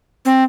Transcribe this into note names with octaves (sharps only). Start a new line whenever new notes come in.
C4